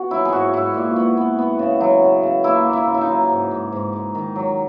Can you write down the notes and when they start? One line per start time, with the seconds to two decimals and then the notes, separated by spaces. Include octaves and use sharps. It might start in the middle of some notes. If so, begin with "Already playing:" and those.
Already playing: B3 F#4
0.10 F#3 E4
0.25 G#4
0.32 G#2 F#4
0.53 G#2 E4
0.74 A#2
0.96 B3
1.17 B3
1.39 B3
1.59 C#3
1.81 F#3
2.03 C#3
2.23 C#3
2.44 A#3 E4
2.66 A#3
2.73 E4
2.87 C#3
2.95 E4
3.01 D#4
3.09 F#3
3.30 G#2
3.51 G#2
3.72 G#2
3.93 G#2
4.15 D#3
4.36 F#3